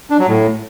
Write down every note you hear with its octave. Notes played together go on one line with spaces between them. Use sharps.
D4
F#3
A2